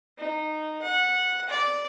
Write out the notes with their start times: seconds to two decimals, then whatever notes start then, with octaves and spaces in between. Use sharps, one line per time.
0.18 D#4
0.82 F#5
1.49 D5